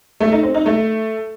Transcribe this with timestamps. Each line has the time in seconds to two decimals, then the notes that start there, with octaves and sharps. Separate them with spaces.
0.20 A3
0.32 D#4
0.43 C4
0.54 D#4
0.66 A3